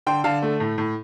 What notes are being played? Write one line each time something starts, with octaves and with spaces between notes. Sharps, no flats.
D3 G5 C6
D3 F5 A5
A3
A2
A2